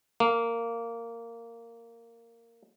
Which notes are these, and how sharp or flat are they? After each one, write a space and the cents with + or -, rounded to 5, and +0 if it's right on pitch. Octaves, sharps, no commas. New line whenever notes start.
A#3 -10